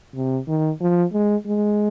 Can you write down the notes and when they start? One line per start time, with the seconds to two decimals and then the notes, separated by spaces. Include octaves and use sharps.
0.15 C3
0.48 D#3
0.81 F3
1.13 G#3
1.47 G#3